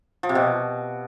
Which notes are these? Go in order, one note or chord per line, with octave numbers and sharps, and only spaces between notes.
F3
C3
B2